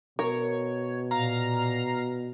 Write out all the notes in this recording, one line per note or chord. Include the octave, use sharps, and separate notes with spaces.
B2 A#4 C#5
A#2 F5 A#5